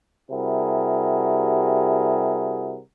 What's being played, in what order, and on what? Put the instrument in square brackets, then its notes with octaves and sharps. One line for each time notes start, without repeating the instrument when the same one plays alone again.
[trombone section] C3 G3 E4 F#4 G#4 A#4